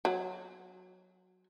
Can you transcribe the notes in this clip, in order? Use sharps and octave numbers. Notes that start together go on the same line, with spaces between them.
F#3